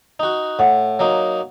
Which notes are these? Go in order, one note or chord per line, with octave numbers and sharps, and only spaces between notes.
D#4 F#4
A2 F#5
F#3 A#3 D#4